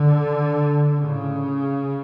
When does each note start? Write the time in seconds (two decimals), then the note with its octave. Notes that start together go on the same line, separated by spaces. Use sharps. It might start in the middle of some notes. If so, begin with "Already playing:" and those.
Already playing: D3
1.00 A2 C#3